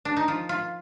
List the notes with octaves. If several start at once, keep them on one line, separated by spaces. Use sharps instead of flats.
D4
D#4
F3 F4
F4